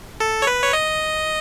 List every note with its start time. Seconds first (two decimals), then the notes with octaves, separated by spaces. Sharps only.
0.20 A4
0.42 C#5
0.47 B4
0.63 C#5
0.73 D#5